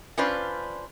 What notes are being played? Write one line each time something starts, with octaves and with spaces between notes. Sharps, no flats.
C#4 D4 F4 B4 C5 D5